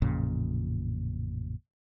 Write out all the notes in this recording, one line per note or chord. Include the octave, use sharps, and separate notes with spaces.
A1 F2 A#2 C#3